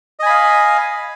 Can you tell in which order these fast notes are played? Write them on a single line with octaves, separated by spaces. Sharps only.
D#5 G#5 B5 F5